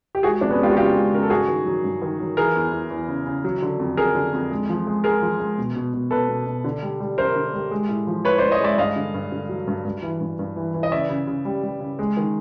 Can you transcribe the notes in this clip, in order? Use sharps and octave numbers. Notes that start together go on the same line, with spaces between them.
G4
G#3 F#4 G#4
F2 D4
B3 C#4
G#3 F4 G4
F#4
C#3 F4 G4
G#3
C#3 A#4
A4
G2 F#4 G#4
D#3
F#3
G2
D#3
F#3
E3 G#4 A#4
E2
E2
E2
C#3
C#3
F#3
D3
F2
F2 G#4 A#4
D3
F2
G#3
F3
G#3
G#3 G#4 A#4
F3
G#3
B2
B2
B2
B2 A4 B4
B2
B2
D3
G3
G3
F#2 A#4 C5
D3
G3
G#3
A2
F3
A2 B4 C#5
C5 D5
A2
C#5 D#5
G#3 D5 E5
G2 D#5 F5
D3
G2
D3
F#3
G2
G2
E3
G2
G2
E3
E3
D#5
C#3 D5 E5
C#3
C#3
G3
G3
C#3
G#3
D#3